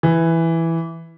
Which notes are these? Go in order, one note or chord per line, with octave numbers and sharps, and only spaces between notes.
E3